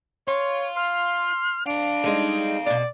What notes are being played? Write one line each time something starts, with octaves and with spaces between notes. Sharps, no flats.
F4 C#5
C6 F6
D4 A4 F5 D7
G3 G#3 D#4
F2 B2 D5